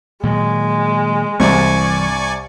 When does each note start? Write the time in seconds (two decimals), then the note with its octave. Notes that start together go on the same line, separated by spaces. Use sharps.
0.23 A#2 D#3 F#3 G#3
1.40 C2 G2 E3 D5 G#5 C#6